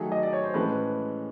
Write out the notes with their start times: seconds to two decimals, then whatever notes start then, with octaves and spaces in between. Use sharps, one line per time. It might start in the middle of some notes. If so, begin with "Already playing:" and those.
Already playing: D#3 F#3 A3 G#4
0.12 D#5
0.23 D5
0.33 C#5
0.44 C5
0.54 A2 E3 G#3 C#4 A4 B4